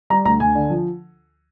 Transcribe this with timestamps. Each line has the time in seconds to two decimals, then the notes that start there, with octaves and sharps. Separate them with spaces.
0.10 G3 A#5
0.25 D2 A#5
0.40 D2 G#5
0.55 D3
0.70 F3